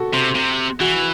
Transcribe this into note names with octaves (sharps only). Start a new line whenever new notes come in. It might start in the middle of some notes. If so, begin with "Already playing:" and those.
Already playing: F#4 A4
C3
C3
E3 F#4